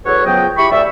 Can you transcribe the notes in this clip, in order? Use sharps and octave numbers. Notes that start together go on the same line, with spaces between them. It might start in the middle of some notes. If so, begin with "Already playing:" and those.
E2 F#3 A4 B4 C#5
C#2 F3 F#3 B3 D#5 G5
E4 G4 B5 C#6
D2 D5 E5